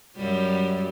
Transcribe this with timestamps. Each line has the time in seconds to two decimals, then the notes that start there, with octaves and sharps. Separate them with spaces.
0.17 F#2 F#3 G3